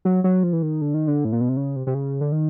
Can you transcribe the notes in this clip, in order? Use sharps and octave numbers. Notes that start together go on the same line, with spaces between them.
F#3
F#3
F3
E3
D#3
D3
D#3
D3
A2
A#2
B2
C3
C#3
C3
C3
C#3
D3
D#3